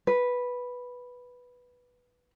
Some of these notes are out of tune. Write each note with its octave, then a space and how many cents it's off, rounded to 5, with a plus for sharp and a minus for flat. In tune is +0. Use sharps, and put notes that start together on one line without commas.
B4 -5